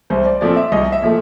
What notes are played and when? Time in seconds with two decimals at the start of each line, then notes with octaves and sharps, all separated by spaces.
0.10 C2 C5
0.26 D5
0.41 A#2 F3 A3 C4 D5
0.57 E5
0.72 C2 D#5
0.92 E5
1.02 A#2 F3 A3